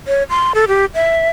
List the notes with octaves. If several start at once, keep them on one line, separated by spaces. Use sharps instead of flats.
C#5
C6
A4
G4
E5